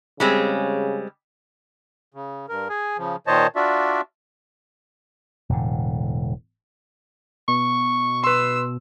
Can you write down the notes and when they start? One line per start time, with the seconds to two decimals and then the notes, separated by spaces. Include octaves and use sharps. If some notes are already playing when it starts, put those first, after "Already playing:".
0.20 C#3 G3 G#3 C4
2.14 C#3
2.49 G2 A#4
2.69 G#4 G#5
2.98 C#3 F3
3.27 A#2 D#3 C5 C#5 D#5 A5
3.56 D4 F4 F#4 D5 E5
5.49 E1 A2 D3
7.48 B2 C#6
8.24 B4 C6 E6